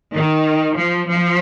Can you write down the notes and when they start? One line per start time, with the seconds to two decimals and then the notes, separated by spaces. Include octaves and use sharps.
0.13 D#3
0.78 F3
1.09 F3